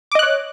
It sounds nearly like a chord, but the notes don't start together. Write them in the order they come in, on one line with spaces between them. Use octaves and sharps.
D6 D#5 F#6 C#5